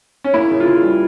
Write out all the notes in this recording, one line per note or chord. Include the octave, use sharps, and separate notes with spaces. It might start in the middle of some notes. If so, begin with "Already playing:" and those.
C#4
A#3 E4
C#3
F4
C#3 E4
G3